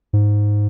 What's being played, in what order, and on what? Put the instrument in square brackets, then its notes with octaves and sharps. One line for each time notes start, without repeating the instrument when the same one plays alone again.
[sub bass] G#2